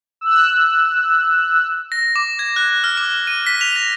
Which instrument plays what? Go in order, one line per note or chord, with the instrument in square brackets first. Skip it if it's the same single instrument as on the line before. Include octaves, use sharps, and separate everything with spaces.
[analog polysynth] E6 F#6
[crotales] A#6
D6
G#6
F#6
F6
D6
D#7
B6
F7
A#6